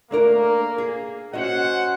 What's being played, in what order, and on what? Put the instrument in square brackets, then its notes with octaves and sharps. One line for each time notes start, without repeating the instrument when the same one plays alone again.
[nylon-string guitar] A3 D4 A#4 [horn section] A#3
[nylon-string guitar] G#4
[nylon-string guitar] C#4 F#4 D#5 [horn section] C5 F#5